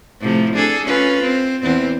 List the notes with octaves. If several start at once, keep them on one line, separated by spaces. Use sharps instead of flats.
A2 C3 F3
D4 G#4 A4
C#4 F4 B4
C4
E2 C4